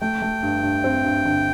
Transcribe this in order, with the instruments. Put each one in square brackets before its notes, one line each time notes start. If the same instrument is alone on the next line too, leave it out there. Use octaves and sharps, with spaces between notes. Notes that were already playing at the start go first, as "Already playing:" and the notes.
[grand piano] A3 [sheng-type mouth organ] G5
[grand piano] A3
G2
G2
C4
G2
D3